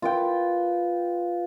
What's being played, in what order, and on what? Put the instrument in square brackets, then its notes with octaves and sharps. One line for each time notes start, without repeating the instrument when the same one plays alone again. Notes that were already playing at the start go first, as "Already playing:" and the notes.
[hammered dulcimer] F4 B4 G5